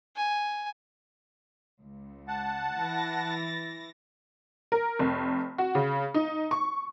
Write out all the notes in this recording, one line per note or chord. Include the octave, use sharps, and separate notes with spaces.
G#5
C#2
F#5 A5
E3 A6 A#6
A#4
F1
F#4
C#3
D#4
C#6